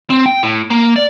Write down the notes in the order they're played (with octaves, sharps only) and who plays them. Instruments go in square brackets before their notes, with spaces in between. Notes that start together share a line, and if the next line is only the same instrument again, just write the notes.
[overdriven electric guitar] C4
G5
A2
A#3
D5